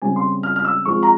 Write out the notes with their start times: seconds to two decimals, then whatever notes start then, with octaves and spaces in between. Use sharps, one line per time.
0.02 C#3 G3 C4 G#5
0.16 C6
0.43 F6
0.56 F6
0.65 E6
0.85 F3 G#3 C4 C#6
1.03 A#5